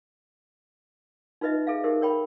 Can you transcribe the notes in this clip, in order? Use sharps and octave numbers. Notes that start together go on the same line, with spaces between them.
D#4 F4 B4 D#5 E5
G#4 A4 E5 F5
D#4 G4 G#4 A#4 C5 E5
A#4 C#5 G5 B5